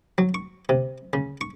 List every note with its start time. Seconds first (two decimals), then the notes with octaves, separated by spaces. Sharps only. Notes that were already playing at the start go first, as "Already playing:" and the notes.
0.18 F#3
0.34 C#6
0.69 C3
1.13 C#3
1.41 C#6